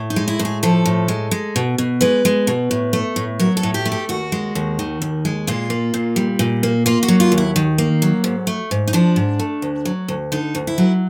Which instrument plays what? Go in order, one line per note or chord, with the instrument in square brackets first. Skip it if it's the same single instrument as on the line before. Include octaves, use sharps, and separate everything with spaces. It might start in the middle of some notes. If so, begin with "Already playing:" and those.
Already playing: [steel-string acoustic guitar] A2
D#4
G#3
E4
A2
G#4
F3 A4
A2
G#3
G#3
B2
B2
G#3 B4
G#3
B2
A2
A3
A2
F#3 A#4
A4
A2
G4
A3
G4
D#2 F#4
G#3
D#2
D#3
D#2
G#3
A#2 F4
A#3
A#2
G3
A#2
A#3
A#3 F4
F#4
F#3
F4
D#2
E4
D#3
A#3
F#3
G#2
A3
G#2
D#4
F3 D4
G#2
A3
D2
F#3
D2
D3 D#4
D2
E4
F#3